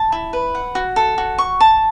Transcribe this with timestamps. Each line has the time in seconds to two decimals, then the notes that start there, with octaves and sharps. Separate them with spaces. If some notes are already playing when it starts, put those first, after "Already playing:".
Already playing: A5
0.12 E4
0.33 B4
0.55 F#5
0.75 F#4
0.96 A4
1.18 F#4
1.38 C#6
1.60 A5